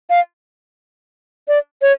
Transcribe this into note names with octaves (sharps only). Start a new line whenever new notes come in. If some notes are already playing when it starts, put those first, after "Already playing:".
F5
D5
C#5